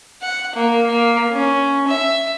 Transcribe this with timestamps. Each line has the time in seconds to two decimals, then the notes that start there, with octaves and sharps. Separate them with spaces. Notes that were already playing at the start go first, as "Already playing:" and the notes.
0.22 F#5
0.55 A#3
0.86 A#3
1.32 C#4
1.87 E5